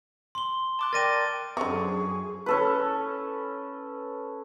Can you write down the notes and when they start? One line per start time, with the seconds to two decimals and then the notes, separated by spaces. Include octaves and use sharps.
0.35 C6 G7
0.79 A5 D6 F#6
0.93 A#4 D5 G5 A6 A#6 D#7
1.57 F#2 D3 C4 G#4 C#6
2.46 C#4 A4 B4